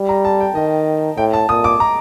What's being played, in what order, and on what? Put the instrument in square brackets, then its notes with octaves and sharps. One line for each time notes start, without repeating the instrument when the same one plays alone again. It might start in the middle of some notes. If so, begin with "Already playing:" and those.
Already playing: [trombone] G3
[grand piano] A#5
A5
G5
[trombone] D#3 [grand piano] D#5
[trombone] A2 [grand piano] G5
[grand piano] A5
[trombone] A#2 [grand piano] D#6
[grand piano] D6
A#5